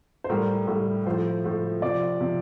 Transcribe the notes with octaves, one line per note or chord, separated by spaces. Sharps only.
C5
A2 G3 A#4
A2 G3
A2 F3 C5
A2 F3
C3 F3 D5
C3 F3